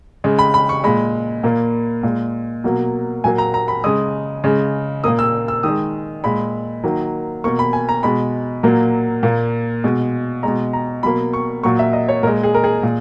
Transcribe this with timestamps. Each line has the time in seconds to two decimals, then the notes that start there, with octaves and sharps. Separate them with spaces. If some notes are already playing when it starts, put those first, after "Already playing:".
0.24 C#3 G#3
0.39 B5
0.54 B5
0.69 C#6
0.84 A#2 G#3 B5
1.43 A#2 A#3
2.03 A#2 G#3
2.64 B2 F#3 A#3
3.24 A#2 F#3 A#3 G#5
3.38 A#5
3.54 A#5
3.68 B5
3.84 C#3 G#3 D#6
4.44 C#3 G#3
5.04 A#2 A#3 D#6
5.19 E6
5.48 E6
5.63 D#3 G#3 D#6
6.24 A#2 G#3 B5
6.83 D#3 F#3 A#3
7.44 B2 A#3 C#6
7.59 B5
7.73 G#5
7.89 A#5
8.03 B2 G#3 B5
8.63 A#2 F#3 A#3
9.23 A#2 A#3
9.84 B2 G#3
10.43 B2 G#3 A#5
10.73 A#5
11.03 B2 F#3 A#3 B5
11.33 C#6
11.63 A#2 F#3 A#3 C#6
11.79 E5
11.93 D#5
12.08 C#5
12.23 A#2 G#3 A#4
12.43 G#4
12.54 A#4
12.64 G#4
12.83 A#2